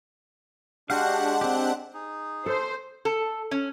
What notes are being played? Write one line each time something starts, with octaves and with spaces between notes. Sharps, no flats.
G#3 D4 F#4 G4 F5 F#5
C4 G4
D#4 G#4
A4 C5
A4
C#4